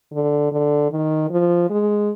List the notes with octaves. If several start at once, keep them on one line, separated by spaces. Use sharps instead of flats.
D3
D3
D#3
F3
G#3